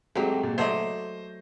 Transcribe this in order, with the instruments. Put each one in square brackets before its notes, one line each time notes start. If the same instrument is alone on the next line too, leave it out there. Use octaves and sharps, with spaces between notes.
[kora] G#2 F#3 [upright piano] A3 C4 G4
[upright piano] A#2
[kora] F#3 A3 D5 [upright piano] C5 D#5